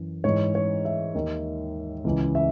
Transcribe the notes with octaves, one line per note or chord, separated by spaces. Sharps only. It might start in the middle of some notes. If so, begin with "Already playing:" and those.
Already playing: F#2 E3
G#2 E3 C#5
C#5
E5
D#2 D#3
C#2 C#3 E3
E5